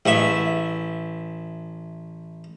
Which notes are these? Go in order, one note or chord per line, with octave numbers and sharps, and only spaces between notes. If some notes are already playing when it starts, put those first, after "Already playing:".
A1 E5